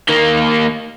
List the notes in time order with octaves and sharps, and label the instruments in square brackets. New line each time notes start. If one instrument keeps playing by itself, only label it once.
[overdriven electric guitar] D#3 A#3